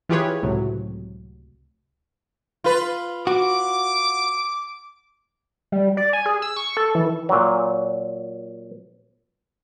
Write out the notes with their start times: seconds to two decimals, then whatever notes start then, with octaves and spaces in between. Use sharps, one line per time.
0.09 E3 F4 G4 G#4 B4 C#5
0.43 C#2 A2 C3 F#3
2.64 F4 B4
3.27 F#4 D6
5.72 G3
5.97 D5
6.13 G#5
6.26 G#4
6.42 E6
6.57 C#6
6.77 A4
6.95 E3
7.29 A#2 F#3